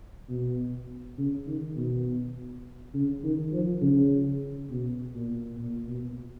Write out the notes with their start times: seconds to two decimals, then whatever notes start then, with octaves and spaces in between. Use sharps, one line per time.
0.29 B2
1.18 C#3
1.47 D#3
1.76 B2
2.94 C#3
3.23 D#3
3.52 F3
3.81 C#3
4.70 B2
5.14 A#2
5.58 A#2
5.88 B2